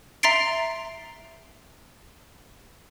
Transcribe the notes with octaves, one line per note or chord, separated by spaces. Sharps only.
E5 A#5 C6 A6 C7 D7